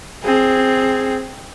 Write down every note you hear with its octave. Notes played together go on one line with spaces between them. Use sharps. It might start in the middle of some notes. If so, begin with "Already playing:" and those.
C4 G#4